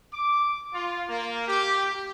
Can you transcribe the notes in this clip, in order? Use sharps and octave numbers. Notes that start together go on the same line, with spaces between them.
D6
F4
A#3
G4